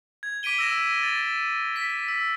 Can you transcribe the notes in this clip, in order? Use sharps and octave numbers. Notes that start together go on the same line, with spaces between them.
G#6
D6 B6 D7 D#7 G7
E6 A#6 E7
A6
B6
E6